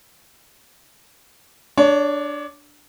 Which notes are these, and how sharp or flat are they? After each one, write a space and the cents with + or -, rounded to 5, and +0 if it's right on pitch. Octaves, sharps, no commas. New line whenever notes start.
D4 +0 C#5 +25